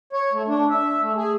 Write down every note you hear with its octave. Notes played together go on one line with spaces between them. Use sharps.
C#5
A3
D4
E5
A3
G#4